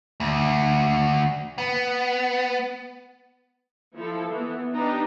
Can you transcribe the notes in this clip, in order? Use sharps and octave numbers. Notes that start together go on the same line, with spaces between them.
D2
B3
F3 E4 A4
E3 B3
D4 D#4 G4 B4